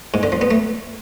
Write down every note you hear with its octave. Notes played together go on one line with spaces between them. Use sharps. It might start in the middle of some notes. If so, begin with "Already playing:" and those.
G#2
D3
F3
B3
A3